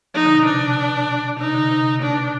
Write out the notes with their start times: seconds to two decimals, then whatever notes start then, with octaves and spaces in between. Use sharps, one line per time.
0.14 F3 D#4
0.25 D3
0.35 B2
0.45 C3 D4
0.77 B2
1.39 C3 D#4
1.54 D3
1.71 C3
2.02 B2 D4